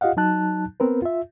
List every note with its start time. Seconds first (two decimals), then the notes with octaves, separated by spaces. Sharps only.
0.01 F4 G4 D#5 F5 F#5
0.17 F#3 D#4 A5 F#6
0.80 B3 C4 A#4 B4
1.02 F4 E5